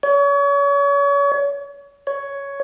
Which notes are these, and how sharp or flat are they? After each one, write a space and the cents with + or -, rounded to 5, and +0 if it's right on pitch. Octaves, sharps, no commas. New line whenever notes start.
C#5 +35
C#5 +10